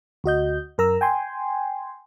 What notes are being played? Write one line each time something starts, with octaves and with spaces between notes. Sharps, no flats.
D2 F#4 D#5 G6
F#2 A#4 A#5 E6
G5 G#5 C6